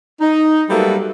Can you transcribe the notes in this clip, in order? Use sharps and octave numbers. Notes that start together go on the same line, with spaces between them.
D#4
F#3 G3 A3 A#3 A4 B4